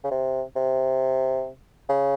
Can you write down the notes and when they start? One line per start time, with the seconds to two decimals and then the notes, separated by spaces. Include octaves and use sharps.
0.04 C#3
0.11 C3
0.56 C3
1.89 C#3